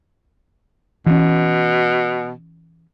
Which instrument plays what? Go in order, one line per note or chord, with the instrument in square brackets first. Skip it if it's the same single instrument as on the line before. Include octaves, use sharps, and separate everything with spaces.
[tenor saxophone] B2 [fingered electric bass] E3 C#4